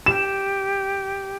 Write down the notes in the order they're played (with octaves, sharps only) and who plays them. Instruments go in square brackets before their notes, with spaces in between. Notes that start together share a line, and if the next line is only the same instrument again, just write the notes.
[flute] G4 [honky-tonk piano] E7